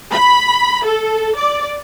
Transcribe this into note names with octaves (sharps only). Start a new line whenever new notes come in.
B5
A4
D5